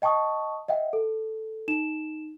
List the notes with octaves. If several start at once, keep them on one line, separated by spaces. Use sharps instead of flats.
D#5 G5 A5 C#6 D#6
D#5 E5 F#5 G5
A4
D#4 E7